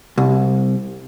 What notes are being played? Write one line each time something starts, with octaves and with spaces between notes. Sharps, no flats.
C2